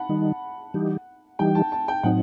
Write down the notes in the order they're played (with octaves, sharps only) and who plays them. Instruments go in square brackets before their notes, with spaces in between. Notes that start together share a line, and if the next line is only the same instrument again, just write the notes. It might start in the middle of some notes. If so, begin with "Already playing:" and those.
Already playing: [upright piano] F#5 A5 B5
[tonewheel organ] D#3 G3 D#4
E3 G3 D#4 G4
[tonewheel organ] E3 G3 D#4 G4 [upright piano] G5
[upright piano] A5
A5
G5
[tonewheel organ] A2 F#3 C4 D#4 [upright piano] F#5